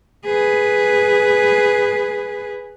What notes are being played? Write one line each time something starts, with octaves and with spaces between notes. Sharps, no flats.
G#4 B4